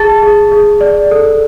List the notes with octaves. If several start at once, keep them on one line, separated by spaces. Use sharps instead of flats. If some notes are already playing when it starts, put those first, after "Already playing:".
Already playing: G#4 A5 A6
G#4
G#4
D5
A4